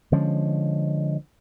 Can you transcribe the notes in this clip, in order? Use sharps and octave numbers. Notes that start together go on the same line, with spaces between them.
D3 F3 G#3 C#4